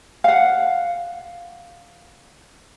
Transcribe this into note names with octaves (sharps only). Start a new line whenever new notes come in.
F5 F#5